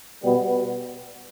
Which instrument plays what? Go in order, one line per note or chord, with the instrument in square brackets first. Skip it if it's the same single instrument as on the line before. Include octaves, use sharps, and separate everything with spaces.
[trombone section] B2 G3 B3